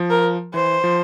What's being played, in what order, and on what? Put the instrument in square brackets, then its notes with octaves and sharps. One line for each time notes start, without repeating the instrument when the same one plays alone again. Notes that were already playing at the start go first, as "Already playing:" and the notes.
Already playing: [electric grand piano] F3
[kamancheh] A#4
[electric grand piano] E3 [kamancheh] C5
[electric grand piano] F3